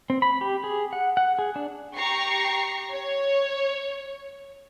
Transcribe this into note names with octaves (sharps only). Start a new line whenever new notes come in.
C4
B5
G4
G#4
F#5
F#5
G#4
D4
G4 A#5 C#6 C7
C#5